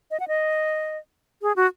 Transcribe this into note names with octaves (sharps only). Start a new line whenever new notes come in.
D#5
F#5
D#5
G#4
F#4